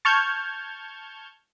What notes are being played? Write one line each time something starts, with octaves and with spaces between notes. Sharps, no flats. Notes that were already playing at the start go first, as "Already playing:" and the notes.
A5 C#6 F6 G6 G#6